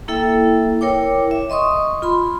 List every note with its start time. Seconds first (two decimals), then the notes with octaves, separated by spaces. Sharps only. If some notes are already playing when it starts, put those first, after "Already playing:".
0.08 A#3 E4 A4 E5 G5
0.81 E4 A#4 C#5 G5 D6
1.31 E5
1.50 D#5 C6 C#6 D#6
2.02 F4 B5 C6